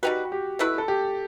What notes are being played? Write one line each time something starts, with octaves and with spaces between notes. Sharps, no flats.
G3 D#4 F#4 G4 B4
G4
B2 A3 E4 B4
A4
G4